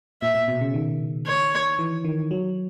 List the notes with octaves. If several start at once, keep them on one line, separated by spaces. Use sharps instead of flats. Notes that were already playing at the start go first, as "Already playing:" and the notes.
A#2 E5
A#2
B2
C#3
D#3
C#5
E3
D#3
F#3